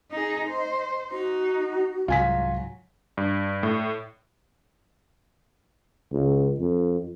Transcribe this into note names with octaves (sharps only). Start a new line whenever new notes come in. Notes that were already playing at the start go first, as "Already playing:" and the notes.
D#4 G#4 D#5
C5
D#4 F#4
C2 G#2 F#3 F4 G#5 B6
G2
A2
C#2
F2